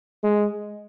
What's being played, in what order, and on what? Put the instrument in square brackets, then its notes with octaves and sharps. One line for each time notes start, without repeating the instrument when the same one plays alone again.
[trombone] G#3